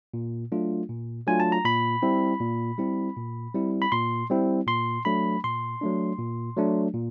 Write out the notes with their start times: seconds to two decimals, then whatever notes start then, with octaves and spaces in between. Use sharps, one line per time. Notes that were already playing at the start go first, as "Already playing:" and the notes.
0.14 A#2
0.52 F#3 A3 D4 F4
0.89 A#2
1.27 F#3 A3 D4 F4 G#5
1.40 A5
1.52 A#5
1.65 A#2 B5
2.02 G3 C4 E4
2.40 A#2
2.78 G3 C4 E4
3.16 A#2
3.54 G3 C4 E4
3.82 B5
3.92 A#2 C6
4.30 G3 C4 E4
4.67 A#2 C6
5.05 F#3 A3 D4 B5
5.44 A#2 C6
5.81 F#3 A3 D4
6.19 A#2
6.57 F#3 A3 D4
6.94 A#2